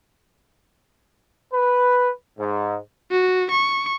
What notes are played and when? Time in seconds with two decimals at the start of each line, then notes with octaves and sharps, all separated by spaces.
1.53 B4
2.39 G#2
3.11 F#4
3.51 C#6